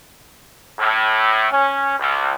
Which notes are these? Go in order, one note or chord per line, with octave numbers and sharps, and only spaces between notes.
A2
C#4
C#2